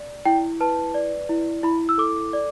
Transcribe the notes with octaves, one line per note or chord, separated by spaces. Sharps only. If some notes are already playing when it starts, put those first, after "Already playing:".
Already playing: D5
E4 G5
B4 A5
D5
E4
E4 B5
E6
A4 D6
D5